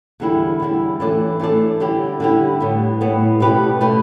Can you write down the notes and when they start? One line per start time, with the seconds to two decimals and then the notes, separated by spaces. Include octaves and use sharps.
0.20 E2 D3 G3 E4
0.60 E2 D3 G3 E4
1.00 E3 A3 D4 A4 D5
1.40 E3 A3 D4 A4 D5
1.80 D3 G3 E4 G4
2.20 D3 G3 E4 G4
2.60 A2 G3 B3
3.01 A2 G3 B3
3.40 B2 A3 G4 B4
3.81 B2 A3 G4 B4